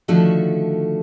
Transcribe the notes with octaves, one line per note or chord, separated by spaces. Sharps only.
D3 D#3 F3 A3 F#4 A4